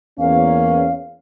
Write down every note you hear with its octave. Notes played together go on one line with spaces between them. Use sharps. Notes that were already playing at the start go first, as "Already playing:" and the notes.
E2 A#3 C#4 F5